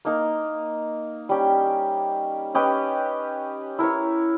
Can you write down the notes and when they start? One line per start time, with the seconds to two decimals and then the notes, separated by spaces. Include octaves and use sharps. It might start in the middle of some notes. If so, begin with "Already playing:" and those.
0.05 A#3 D#4 A#4
1.29 G3 C#4 G4
2.54 C#4 G4 B4 D#5
3.79 E4 A#4 C#5